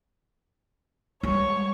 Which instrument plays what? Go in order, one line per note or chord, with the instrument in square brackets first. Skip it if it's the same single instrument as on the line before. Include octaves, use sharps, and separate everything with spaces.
[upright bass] G3 G#3 [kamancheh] C#5 C#6